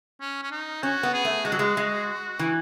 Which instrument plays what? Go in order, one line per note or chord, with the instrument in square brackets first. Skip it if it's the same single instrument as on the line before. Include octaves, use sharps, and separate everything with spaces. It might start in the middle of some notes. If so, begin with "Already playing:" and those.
[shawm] C#4
C#4
D#4
[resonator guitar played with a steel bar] C#4 [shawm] F#4
[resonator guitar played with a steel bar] B3
[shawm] G#4
[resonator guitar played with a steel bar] A3
[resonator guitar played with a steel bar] G#3 [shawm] F#4
[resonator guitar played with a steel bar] F#3
G#3
G#3
E3